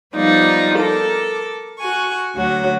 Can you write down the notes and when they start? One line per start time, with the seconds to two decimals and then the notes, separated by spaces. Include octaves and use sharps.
0.15 F3 G3 B3 D#4 F4 D5
0.78 A4 A#4 D6
1.78 F#4 G#5 C#6
2.36 D2 F#3 F#4